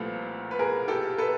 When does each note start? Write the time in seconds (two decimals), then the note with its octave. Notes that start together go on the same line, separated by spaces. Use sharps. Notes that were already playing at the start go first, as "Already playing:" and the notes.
Already playing: C2 A#2 F3 A3 A4 B4
0.51 B4
0.59 G#4 A#4
0.88 G4 A4
1.18 A4 B4